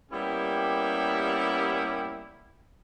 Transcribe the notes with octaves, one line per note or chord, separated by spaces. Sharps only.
G3 A#3 B3 C#4 E4 G4